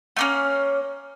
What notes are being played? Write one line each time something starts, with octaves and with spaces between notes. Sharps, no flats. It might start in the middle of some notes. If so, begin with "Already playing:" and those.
A3 A#3 C#4